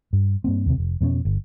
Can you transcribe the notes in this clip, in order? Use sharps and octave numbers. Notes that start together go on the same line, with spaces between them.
G2
G2 A#3 C4
D#2 C3
F1
F2 B2 G3 C#4
G1